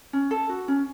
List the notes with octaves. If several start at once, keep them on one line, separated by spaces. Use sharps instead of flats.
C#4
A4
F#4
C#4